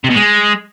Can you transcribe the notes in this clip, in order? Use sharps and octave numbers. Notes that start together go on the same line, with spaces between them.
C3
B2
G#3